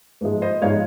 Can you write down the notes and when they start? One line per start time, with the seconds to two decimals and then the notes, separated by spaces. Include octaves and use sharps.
0.21 G#2 F3 G#3
0.42 C5 D#5
0.62 G#2 F3 G#3 C#5 F5